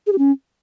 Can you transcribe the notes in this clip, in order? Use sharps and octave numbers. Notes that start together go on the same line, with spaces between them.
G#4
G4
C#4